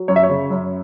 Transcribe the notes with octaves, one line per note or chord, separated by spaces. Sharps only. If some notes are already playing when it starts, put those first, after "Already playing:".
Already playing: F#3
F#2 C#5
E5
C#5
C#3
F#2